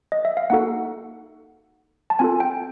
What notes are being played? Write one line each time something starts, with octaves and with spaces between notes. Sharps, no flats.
D#5
E5
F5
A#3 D#4 F#4 A4 F#5
A5
C4 F4 A4 G#5
G5